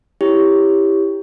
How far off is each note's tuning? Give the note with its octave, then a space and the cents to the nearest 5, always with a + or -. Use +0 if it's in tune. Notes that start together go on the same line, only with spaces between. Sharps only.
E4 +0 G4 +5 C#5 +0